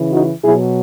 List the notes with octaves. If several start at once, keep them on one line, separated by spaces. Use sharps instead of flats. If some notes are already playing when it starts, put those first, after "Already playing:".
Already playing: C#3 E3
D#4 F#4
B2 F#3 E4 G#4